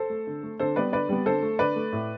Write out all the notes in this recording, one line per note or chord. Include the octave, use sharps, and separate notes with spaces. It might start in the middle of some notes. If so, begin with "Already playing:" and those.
Already playing: A4 C5
A3
D3
A3
D3 A4 C5
G3 B3 B4 D5
D3 B4 D5
G3 B3
D3 A4 C5
A3
D3 B4 D5
A3
A2